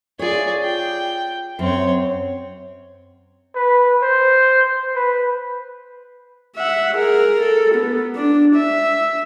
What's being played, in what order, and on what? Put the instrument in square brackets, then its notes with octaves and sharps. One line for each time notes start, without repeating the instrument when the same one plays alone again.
[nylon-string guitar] F4 C#5 [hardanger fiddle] G#4 D5
[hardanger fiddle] G5
[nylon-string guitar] F#2 [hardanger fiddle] C4 C#5
[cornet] B4
C5
B4
[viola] E5 F#5
G#4 A#4
A4
B3
D4
E5